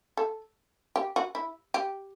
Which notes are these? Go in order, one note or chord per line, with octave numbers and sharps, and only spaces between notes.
A4
G4
F#4
E4
G4